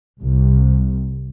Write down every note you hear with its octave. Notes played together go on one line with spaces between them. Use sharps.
C2